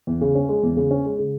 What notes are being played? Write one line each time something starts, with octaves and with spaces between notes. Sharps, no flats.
E2
C#3
C#4
G#3
E2
C#3
C#4
G#3
C#3